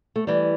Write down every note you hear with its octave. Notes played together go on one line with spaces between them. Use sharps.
A3
E3 G3